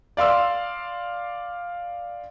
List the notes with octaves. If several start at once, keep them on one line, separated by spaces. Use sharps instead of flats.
D5 F5 C6 E6